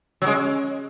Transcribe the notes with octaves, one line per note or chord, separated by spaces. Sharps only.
F#3
G#3 C#4